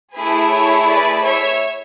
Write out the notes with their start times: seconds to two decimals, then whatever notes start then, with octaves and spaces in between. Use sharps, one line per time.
0.15 A3 E4 G#4 B4
0.51 C#5
0.87 B4 D5
1.23 C#5 E5